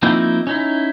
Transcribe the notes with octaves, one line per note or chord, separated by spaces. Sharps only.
F3 A#3 C4 D#4 E4
C#4 D#4 E4